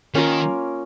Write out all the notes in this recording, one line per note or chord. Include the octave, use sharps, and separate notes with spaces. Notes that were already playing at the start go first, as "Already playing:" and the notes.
D#3 A#3 C#4 F4 A#4